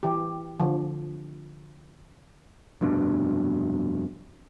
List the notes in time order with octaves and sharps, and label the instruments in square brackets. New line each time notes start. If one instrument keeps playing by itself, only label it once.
[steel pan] E3 G4
D3 F3
[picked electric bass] F1 G2 B2 D4